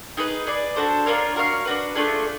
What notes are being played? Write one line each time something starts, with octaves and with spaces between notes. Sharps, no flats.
D#4 G#4 B4
G#4 B4 D5
D4 F#4 A4 C5
D4 F4 A#4 C#5
F#4 A#4 C#5 F5
D4 F#4 B4
A3 D4 F4 G#4